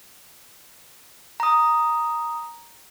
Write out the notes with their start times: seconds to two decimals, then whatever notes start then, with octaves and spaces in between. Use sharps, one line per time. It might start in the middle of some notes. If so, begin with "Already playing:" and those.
1.40 A#5 D#6